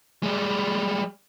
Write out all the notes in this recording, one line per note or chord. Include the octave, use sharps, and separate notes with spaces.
G3 G#3